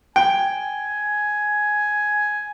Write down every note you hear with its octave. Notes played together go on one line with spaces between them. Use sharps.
G5 G#5